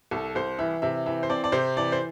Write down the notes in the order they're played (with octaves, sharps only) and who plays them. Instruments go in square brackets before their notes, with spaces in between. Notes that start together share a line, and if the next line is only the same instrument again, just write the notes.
[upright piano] C2 A4
C2 C5
E3 E5
C3 E5
E3 E5
C5
C4 D5
D5
C3 C5
E3 D5
C5